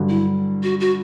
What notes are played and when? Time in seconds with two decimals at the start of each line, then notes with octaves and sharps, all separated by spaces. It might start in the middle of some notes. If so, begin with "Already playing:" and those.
Already playing: G2 D3 F#3
0.09 E4
0.63 F#4
0.80 F#4